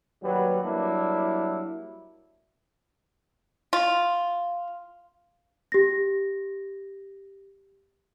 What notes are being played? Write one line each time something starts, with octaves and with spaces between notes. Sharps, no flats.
D#2 F#3 G3 B4
F#3 G3 A#3 D4 E4
F4
G4 A#6